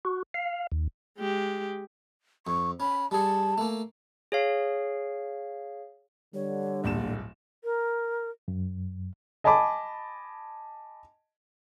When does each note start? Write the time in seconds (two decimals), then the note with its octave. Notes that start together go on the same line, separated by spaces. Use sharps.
0.05 F#4
0.34 F5
0.72 D#2
1.18 G#3 G4
2.47 F2 C#6
2.80 C#4 B5
3.11 G3 G#4 A5
3.58 A3 A#3
4.32 G#4 C#5 F5
6.34 D3 G3 C#5
6.84 D1 A#1 A#3 E7
7.64 A#4
8.48 F#2
9.44 D#5 G#5 A5 B5 D6